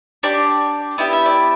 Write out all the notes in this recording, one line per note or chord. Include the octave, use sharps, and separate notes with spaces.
D4 G4 D5
B3 E4 G4 D5
E5
D5